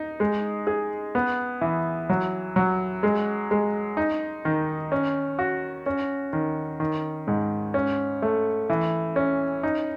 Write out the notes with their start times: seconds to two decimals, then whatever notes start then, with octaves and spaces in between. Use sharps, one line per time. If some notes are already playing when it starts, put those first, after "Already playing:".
Already playing: D#4
0.20 G#3
0.67 G#4
1.15 B3
1.61 E3
2.10 F#3
2.56 F#3
3.03 G#3
3.51 G#3
3.97 D#4
4.45 D#3
4.92 C#4
5.39 F#4
5.86 C#4
6.33 D#3
6.80 D#3
7.27 G#2
7.74 C#4
8.22 A3
8.70 E3
9.16 C#4
9.63 D#4